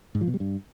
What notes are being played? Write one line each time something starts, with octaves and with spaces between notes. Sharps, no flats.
G#2
F3
B2
G3
G2